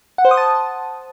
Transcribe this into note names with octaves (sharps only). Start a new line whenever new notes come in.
F#5
C5
D#6
A5